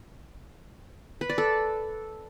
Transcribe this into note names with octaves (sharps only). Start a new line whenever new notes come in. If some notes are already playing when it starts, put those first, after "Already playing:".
B4
D5
A4